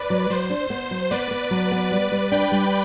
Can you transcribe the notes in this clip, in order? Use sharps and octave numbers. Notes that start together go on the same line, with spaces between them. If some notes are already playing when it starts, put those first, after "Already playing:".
Already playing: B4 D5
F#3
F#3 C5
D4
B3 C5
F#3
B3 B4 D5
B3
F#3
B3
G3
G3
D4 G5 B5
G3